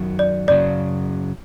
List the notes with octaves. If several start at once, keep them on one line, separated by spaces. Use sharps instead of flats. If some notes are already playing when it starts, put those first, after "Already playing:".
Already playing: F#2 D#3 F#3
D5
F#2 C#3 F#3 D5